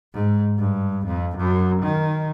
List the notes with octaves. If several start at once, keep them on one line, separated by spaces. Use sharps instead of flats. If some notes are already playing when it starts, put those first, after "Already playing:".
G#2
G2
F2
F#2
D#3